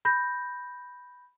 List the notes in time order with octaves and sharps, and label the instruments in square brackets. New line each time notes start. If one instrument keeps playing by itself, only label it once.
[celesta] B5 G6 A#6